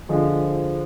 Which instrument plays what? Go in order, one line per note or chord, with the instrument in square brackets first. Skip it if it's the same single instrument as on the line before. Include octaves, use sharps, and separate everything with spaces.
[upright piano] D3 F3 G#3